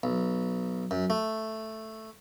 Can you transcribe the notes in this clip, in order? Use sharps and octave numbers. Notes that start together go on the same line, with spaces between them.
B1
F#2
A3